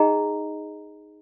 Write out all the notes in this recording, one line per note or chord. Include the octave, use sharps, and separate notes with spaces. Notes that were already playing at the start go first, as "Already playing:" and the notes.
Already playing: D#4 G#4 D#5 G5 A#5